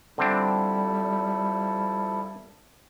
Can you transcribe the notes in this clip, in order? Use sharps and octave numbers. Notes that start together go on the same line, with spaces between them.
D3 F3 G3 C4 D4 E4 A4